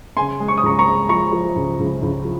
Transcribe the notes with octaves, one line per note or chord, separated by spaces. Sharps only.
C#3 G#5 C6
G#3
C#6
D#6
C#2 A#5 C#6
A#5 C#6
G#3
F3 A#5 C#6
F3
C#2
C#2
C#2
F3